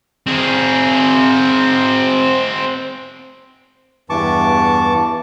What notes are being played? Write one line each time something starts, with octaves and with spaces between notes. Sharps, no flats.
C4 G#4
E2 G2 E3 A5 C#6 D6